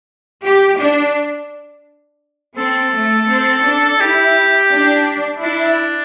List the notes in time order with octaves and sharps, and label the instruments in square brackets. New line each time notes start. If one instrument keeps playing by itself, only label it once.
[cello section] G4
D4
[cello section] C4 [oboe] A4
[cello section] A3
C4
D4
[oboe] A4
[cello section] E4 [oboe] G4
[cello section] D4
[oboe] D4 [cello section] E4